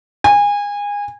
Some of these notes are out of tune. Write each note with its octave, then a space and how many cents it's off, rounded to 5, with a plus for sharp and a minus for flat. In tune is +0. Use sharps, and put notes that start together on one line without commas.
G#5 -25